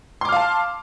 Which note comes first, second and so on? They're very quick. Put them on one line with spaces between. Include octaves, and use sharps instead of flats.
C6 D6 F6 F5 A5